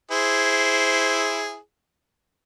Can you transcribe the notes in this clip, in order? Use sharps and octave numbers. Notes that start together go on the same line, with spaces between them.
E4 G#4 C5